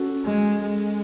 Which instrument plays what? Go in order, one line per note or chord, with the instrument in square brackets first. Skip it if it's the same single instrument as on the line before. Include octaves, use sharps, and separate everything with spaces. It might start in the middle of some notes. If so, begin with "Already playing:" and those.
Already playing: [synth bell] C#4 F#4 A4
[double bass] G#3
G#3